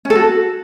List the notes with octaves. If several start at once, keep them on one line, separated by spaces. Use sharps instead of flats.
C#4
A4
F#4